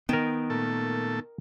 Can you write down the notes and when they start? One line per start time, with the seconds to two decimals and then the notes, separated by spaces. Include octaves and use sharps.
0.09 D#3 B3 A#4 G5
0.50 A#2 A3 A4